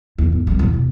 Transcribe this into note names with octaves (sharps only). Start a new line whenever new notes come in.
E2
G#2
G3 C4
E2 A#2
B2